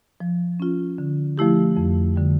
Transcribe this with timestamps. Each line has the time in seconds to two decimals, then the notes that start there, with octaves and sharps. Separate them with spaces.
0.20 F3
0.60 C#4 F4
0.98 D3
1.38 F3 A3 E4 G4
1.77 F2
2.16 D3 G3